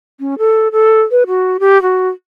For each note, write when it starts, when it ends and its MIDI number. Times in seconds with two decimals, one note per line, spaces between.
0.20 0.35 61
0.39 0.68 69
0.72 1.01 69
1.11 1.24 71
1.27 1.57 66
1.60 1.81 67
1.82 2.09 66